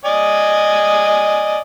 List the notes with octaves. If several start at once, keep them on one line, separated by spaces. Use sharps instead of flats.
D5 D#5 G#5